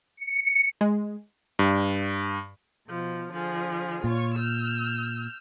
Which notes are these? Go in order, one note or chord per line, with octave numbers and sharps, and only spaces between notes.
C#7
G#3
G2
B2 F3
D3 F3 G#4
A#2 F4 C#5 C#6
E6 F6 G6